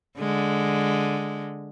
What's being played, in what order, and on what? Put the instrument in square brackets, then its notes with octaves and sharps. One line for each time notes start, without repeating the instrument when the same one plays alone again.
[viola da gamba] D3 G#3